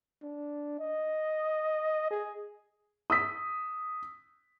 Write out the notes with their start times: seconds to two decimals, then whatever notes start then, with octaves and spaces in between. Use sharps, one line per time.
0.22 D4
0.79 D#5
2.11 G#4
3.10 D#6 E6 B6